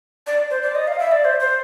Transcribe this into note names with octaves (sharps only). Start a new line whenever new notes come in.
D5
C5
D5
D#5
F5
E5
D5
C5
C5